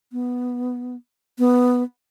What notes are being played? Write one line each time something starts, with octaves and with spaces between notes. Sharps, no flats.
B3
B3